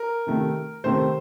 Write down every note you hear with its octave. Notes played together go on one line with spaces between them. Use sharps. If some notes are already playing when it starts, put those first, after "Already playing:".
Already playing: A#4
C3 D#3 A3
C3 D#3 A3 C5